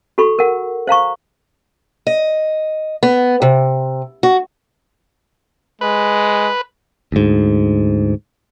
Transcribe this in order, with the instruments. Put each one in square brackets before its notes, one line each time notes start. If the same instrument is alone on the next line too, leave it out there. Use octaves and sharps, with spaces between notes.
[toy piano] F#4 A4 B5 C#6
A#4 F#5
C5 F5 A#5 C#6
[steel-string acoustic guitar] D#5
B3
C3
F#4
[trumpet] G#3 [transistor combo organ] B4
[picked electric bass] D2 G#2